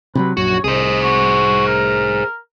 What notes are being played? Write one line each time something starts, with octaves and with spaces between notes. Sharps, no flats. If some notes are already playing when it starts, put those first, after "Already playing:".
C3 E3 F#3 B4
A#1 F#2 F#4 C#5
C2 G#4 C5 D#5
F#4
A#4